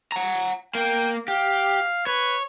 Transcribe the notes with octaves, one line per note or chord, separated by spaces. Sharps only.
F#5 A#5
A#3 G5
G4 F5
B4 C#5